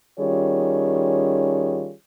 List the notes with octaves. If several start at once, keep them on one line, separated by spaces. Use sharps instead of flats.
D#3 G3 C#4 F4 G#4 C#5